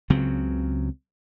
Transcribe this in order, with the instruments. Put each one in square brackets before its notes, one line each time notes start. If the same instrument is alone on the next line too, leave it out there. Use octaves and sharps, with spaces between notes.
[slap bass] C#2 C#3 F#3 C4